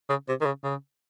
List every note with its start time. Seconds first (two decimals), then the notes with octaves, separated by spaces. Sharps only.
0.10 C#3
0.28 C3
0.41 D#3
0.46 C#3
0.64 C#3